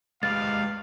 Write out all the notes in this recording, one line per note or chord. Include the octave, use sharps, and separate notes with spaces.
G#3 G4 B4 F5 A6